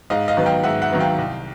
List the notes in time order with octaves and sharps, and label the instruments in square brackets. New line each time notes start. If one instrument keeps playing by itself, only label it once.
[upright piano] G#2 D#5 F5
D#5 F5
D#3 F#3 B3
F5 G5
G#2 E5 F#5
E5 F#5
D#3 F#3 B3
F5 G5
C2